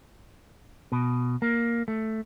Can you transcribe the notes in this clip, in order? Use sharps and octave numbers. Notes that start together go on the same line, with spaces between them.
B2
A#3
A3